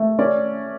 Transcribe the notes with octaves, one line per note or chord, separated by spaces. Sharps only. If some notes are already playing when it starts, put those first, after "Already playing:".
Already playing: A3
C#4 D5